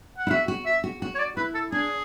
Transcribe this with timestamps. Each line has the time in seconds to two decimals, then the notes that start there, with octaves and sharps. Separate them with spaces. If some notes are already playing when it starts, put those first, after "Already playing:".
0.18 F#5
0.27 E4
0.30 F#4 E5
0.48 F#4
0.66 E5
0.84 F#4
1.02 F#4
1.15 C#5
1.19 D5
1.37 E4 B4
1.54 A4
1.72 D4 G#4